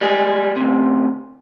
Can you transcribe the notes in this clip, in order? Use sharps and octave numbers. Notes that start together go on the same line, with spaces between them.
G3 G#3 G#4
D2 C3